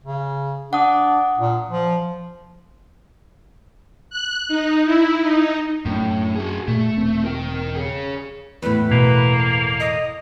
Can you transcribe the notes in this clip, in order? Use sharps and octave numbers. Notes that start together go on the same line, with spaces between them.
C#3
D4 F#5 D#6
A#2
F3
F#6
D#4
E4
D#4
F#2 A2 C#4 D4
F#4 G#4
A#2 A3
E1 C4
A#4 G5
G#4 C#5
E2 A2 B4
B2 A#3
D#5